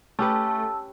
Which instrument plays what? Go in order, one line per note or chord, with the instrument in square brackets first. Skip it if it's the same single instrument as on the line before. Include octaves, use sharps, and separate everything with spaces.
[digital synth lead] A3 [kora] C#4 G4 B4 [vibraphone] A5 E6